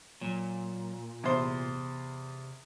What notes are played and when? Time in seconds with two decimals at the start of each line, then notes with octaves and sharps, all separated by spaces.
0.21 A#2 F#3
1.24 E2 C3 C5